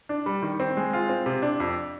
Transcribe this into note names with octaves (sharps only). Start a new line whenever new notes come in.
D4
G3
D#3
C4
G#3
F4
C4
C3
D4
F2